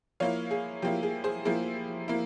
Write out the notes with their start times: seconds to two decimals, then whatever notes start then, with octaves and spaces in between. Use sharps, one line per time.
0.20 F3 A#3 E4 C#5 F5
0.51 G#4
0.82 F3 A#3 E4 G4
1.03 G#4
1.24 G#4 C5
1.45 F3 A#3 E4 G#4
2.08 A#3 E4